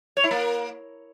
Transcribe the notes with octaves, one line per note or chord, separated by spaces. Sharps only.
C#5
E4
A#3